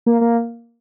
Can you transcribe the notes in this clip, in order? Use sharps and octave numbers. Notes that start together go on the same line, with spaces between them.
A#3
A#3